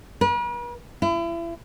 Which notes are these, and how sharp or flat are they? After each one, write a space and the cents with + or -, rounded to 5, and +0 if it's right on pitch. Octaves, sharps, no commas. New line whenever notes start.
B4 -45
E4 +35